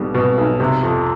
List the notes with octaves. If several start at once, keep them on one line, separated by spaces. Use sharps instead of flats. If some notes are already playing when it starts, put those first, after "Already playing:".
Already playing: B1 B2 G3
B2
B1
C3
F2